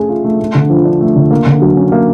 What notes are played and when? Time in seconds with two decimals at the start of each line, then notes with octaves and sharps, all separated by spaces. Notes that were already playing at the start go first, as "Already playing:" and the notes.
Already playing: A3 C#4 G#4
0.09 F4
0.24 A3
0.40 A3
0.55 D3
0.70 F3
0.85 D4
1.01 A3
1.16 D3
1.31 A#3
1.46 D3
1.62 F#3
1.77 C#4
1.92 A#3